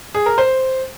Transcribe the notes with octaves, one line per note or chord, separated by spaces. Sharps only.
G#4
A#4
C5